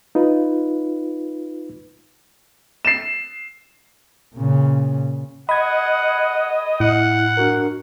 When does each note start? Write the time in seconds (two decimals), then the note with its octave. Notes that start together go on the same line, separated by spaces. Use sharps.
0.15 D#4 F4 B4
2.85 C7 E7
4.35 A#2 C#3
5.49 D#5 F#5 B5 G#6
6.80 A2 E4 F#5
7.37 D4 F#4 A#4